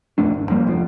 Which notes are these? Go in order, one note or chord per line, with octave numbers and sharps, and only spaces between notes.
D#1 F2 A3 D4
G#1
F2 F3 G3 A#3
F1 F3